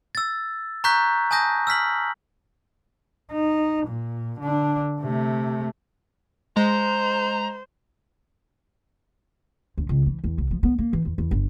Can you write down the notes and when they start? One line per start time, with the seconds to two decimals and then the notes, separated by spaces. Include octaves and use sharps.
0.15 E6 A6
0.84 A#5 C#6 F#6 G6 B6
1.31 G#5 A5 D#6 G6 A#6
1.67 E6 F6 B6 F#7
3.32 D#4
3.87 A#2
4.40 D3 D4
5.01 C3 A3
6.57 G#3 C5 A#5
9.78 D2
9.89 C#2
10.06 E3
10.24 E2
10.38 C2
10.51 F3
10.63 B3
10.78 A#3
10.93 E3
11.05 E2
11.18 E2
11.31 G1